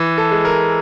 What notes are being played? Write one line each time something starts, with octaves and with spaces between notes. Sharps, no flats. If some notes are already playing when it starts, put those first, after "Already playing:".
Already playing: E3
A4
G#3
A#4